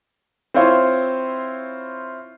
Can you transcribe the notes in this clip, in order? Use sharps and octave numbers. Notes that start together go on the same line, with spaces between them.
C4 E4 F4 C5 C#5